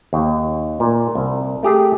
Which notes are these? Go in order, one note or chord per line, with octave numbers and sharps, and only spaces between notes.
D#2
A#2
C2
A3 G4 G#4